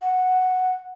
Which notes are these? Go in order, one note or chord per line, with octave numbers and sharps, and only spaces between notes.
F#5